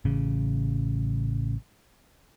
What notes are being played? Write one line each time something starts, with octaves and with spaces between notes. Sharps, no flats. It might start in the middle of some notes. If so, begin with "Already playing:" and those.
A1 C#3